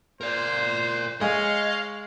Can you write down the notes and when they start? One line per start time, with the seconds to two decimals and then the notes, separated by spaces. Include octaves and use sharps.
0.21 A#4 C5 D5
1.21 G#3 C#5 D#5 F5